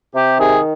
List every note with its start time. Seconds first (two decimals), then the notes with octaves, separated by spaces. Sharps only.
0.15 C3 G4
0.39 D#3 G#4